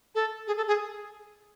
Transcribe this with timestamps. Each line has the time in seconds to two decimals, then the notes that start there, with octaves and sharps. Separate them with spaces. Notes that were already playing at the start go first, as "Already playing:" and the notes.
0.15 A4
0.47 G#4
0.57 A4
0.67 G#4